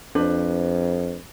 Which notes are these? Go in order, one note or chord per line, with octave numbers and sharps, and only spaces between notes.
F2 D4 B4 C5